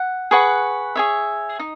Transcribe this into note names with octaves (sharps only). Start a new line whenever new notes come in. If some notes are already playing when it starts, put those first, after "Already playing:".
Already playing: F#5
G#4 B4 F#5 C#6
G#4 C#5 E5
D#4